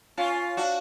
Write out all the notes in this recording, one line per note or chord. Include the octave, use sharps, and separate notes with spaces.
C#4 F4
D4 F#4